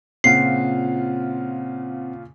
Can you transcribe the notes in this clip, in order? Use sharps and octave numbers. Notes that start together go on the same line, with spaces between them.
A#2 C#3 C4 F4 F#5 C7